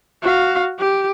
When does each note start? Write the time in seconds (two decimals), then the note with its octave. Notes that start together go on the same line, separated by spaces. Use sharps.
0.22 F#4 F5
0.79 G4